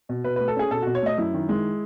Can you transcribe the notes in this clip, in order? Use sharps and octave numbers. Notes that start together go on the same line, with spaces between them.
B2
B2 B4
A3 B4
A4
C#4 G#4
B2 A4
B2 F#4
C#5
A3 D#5
F#2 E4
D#3
G#3